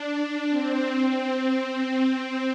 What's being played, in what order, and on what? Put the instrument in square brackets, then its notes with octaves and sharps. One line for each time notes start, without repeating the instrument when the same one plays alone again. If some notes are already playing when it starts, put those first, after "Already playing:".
Already playing: [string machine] D4
C4
C4